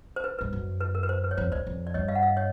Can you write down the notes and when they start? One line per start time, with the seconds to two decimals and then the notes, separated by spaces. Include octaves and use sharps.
0.16 C5
0.24 B4
0.39 G2 B4
0.53 F#2
0.81 B4
0.95 A#4
1.03 B4
1.09 C5
1.24 B4
1.31 C#5
1.37 F2 C5
1.52 E2 C5 D5
1.67 F2
1.87 D5
1.94 G2 C#5 D#5
2.08 D#5 F5
2.15 F#5
2.23 D#5 F5
2.37 C#5 D#5